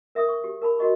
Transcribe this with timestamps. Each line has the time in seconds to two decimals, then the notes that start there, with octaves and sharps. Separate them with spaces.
0.15 A#4 E5 C#6 D#6
0.29 C#6
0.44 G4
0.62 A#4 A5 B5
0.79 F#4 A#4 D#5 C#6